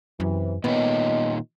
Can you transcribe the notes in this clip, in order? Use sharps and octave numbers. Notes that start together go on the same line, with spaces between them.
F#2 C3 E3
A#2 D#3 B3 C#5 D#5